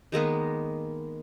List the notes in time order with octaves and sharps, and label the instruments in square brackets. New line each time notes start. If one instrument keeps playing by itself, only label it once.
[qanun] D#3 G#3 A#3 B3